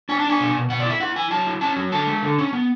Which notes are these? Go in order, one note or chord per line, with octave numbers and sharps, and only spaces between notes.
D4 G#5
A5
D4
G#5
B2
B2
B2 F#5
D5
E4 E5
E4 F#5
E4 G#5
F#3 A5
E4
C#4 A5
F#3
D3 A5
G#3
D3
C#4
B3